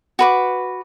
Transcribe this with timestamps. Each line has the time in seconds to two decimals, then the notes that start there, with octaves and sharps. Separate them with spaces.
0.19 F#4 B4 D6